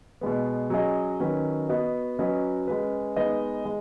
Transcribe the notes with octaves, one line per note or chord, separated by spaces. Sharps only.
B2 G#3 B3
F#3 C#4 G#4 D#5
D#3 F#3 C#4 B4
B3 F#4 D#5
F#3 C#4 F#4 B4 D#5
G#3 C#4 B4
G#3 B3 D#4 B4 D#5
G#3